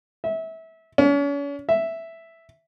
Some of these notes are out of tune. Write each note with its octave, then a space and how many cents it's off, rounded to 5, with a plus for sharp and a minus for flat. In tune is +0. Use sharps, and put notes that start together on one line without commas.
E5 -25
C#4 +40
E5 +0